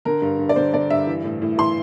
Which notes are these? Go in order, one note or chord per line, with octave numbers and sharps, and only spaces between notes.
D3 A#4
G2
G2
D5
D3 C5
D3 D5
G2 E5
E3
A2
A2
E3 C6